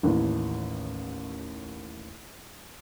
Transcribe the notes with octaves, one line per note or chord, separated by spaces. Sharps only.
A1 D#2 A2